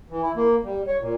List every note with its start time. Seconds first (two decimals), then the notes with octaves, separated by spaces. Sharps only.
0.09 E3
0.22 E4
0.36 A#3
0.64 G3
0.87 C#5
1.00 A#2